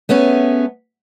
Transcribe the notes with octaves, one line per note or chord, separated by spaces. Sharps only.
A3 B3 C#4 G#4